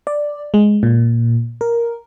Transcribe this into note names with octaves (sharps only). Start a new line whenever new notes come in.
D5
G#3
A#2
A#4